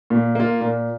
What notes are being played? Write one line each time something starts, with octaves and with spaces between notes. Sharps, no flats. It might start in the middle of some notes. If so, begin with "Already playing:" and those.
A#2
A#3 F4
A#2